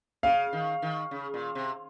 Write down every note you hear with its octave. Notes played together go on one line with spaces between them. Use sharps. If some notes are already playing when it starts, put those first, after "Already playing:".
C#3 F5
D#3
D#3
C#3
A#2
C3